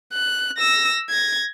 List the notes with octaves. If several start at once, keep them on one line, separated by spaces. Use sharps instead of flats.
F#6
E6 A#6
G#6 A#6